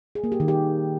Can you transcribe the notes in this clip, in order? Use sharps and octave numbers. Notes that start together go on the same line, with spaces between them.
G#4
A#3
G4
D#3
G4